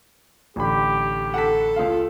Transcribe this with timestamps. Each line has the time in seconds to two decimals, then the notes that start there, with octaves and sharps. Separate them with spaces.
0.56 A1 D3 G4 B5
1.34 A4 F#5 A5 B6
1.76 C#2 F4 F5